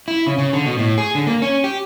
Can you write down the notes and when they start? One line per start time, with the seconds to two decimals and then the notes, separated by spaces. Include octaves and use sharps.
0.08 E4
0.26 C#3
0.38 C#3
0.53 D3
0.66 B2
0.79 A2
0.98 G#4
1.15 D3
1.27 A#3
1.42 C#4
1.64 G4